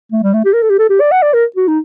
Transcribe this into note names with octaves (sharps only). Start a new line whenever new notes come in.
A3
G3
A3
G4
A#4
A4
G4
A4
G4
D5
F#5
D5
A#4
F#4
D#4